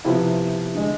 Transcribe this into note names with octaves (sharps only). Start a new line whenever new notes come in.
C3 F3 B3 E4
D3 G#3